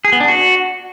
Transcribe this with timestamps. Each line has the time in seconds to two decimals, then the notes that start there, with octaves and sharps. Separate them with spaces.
0.05 G#4
0.12 B3
0.20 D4
0.28 F#4